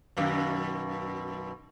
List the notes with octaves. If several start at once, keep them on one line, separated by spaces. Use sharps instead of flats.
F#2 B2 D#3